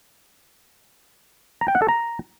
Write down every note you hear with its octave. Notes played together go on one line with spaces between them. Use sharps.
A#5
G5
F#5
A4
A#5